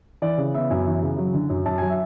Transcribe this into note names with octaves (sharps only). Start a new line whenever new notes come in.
E3 D5
C#3
B3 E5
F#2 G#5
E3
C#3
F#3
D3
F#2
F#2 A5
F#3 G#5
E5